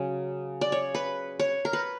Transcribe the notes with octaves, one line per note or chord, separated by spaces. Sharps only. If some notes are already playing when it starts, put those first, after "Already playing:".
Already playing: C#3 F#3
D5
C#5
B4
C#5
A#4
B4